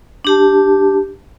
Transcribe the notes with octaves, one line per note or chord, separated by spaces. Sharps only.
D4 G4 A5